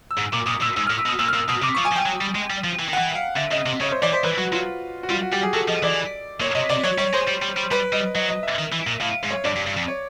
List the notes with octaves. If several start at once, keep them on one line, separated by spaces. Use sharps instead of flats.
E6
G#2
A#2 D6
A#2 D#6
A#2 E6
G#2 E6
F6
A2
E6
B2
D#6
A#2 E6
F6
A#2 E6
B2 D#6
C3 D6
C#6
F3
G#5
F3
G5
F#3
G3
G#3
G3
F3
E3
D#3
E3 F#5
F5
D3 E5
C#3 D#5
C3
C#3 C#5
C5
E3 D5
C5
E3 B4
F#3 F#4
F#3 F4
F#4
G3 F4
F#4
G3 G4
G#4
F#3 A4
F3 D#5
E3 D5
A#2 C#5
C3 D#5
C3 D5
F#3 C#5
G3 C#5
G#3 C5
G3
G3
G3
G3 B4
G3 D#5
F#3 D#5
D#5
E5
D#3
E3
A#2
A2 F5
G#2
C#5
G2 D5
G2
G2
F2
C#5